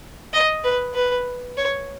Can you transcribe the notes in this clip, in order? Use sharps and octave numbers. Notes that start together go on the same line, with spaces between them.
D#5
B4
B4
C#5